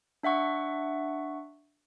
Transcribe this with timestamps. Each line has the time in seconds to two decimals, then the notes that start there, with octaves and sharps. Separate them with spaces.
0.23 D4 E5 F#5 C#6